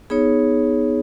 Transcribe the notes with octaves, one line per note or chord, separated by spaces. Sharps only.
B3 D#4 G#4 C#5